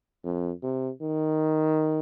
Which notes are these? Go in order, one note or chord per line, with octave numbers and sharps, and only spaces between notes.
F2
C3
D#3